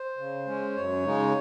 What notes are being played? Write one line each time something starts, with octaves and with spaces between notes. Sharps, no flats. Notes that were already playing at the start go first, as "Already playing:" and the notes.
Already playing: C5
C#3
G#3 C#4
F#2 C#5
C#3 G#3 D#4